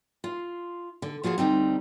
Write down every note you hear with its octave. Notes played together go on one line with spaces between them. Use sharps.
F4
D3
F3 F4 F#4 G#4 A5
D2 G3 C4 D#4